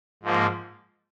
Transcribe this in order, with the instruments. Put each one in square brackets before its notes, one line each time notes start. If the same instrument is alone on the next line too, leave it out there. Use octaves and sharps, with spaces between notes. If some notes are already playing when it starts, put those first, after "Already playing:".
[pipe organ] G#2 F3 A#3